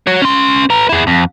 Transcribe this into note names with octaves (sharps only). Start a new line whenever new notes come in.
F#4 C#5
C#4 C6
B4 A#5
E4 G#4
F2